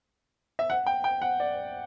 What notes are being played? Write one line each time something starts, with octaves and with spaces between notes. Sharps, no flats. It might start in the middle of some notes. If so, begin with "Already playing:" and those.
E5
F#5
G5
G5
F#5
D5